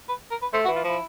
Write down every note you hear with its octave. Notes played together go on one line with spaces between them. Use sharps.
B4
A#4
B4
A3 C5
F#4
E3
F4
F3 E4